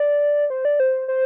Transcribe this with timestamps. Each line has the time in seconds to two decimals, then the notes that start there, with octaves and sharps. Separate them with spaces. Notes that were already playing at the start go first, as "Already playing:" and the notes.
Already playing: D5
0.50 C5
0.65 D5
0.80 C5
1.08 C5